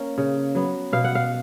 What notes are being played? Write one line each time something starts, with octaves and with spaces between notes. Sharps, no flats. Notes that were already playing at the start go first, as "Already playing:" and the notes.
Already playing: A#3 C#4
C#3
F#3 B3
B2 F5
F#5
F5